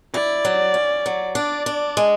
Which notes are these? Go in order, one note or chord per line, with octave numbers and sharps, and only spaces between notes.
E4 D5
F#3
C#4
F#3
D4 D5
D4
G#3